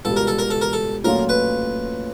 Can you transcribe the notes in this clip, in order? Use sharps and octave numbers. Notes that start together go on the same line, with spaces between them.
C#2 B2 G3 A4
A#4
A4
A#4
A4
A#4
A4
A#2 F#3 A3 C#4 F4 A#4
B4